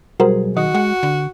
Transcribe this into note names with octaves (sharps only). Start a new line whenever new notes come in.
B1 G3 F#4 G#4 A#4 C5
D#3 F#4 D#5
G#3 F#5
D3